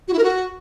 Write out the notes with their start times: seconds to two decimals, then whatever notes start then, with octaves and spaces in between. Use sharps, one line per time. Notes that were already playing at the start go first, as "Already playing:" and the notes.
0.08 F#4
0.13 E4
0.18 A#4
0.24 F#4